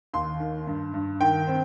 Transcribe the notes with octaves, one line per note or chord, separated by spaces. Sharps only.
D#2 C6
D#3
G2
G2
D#3 G5
C4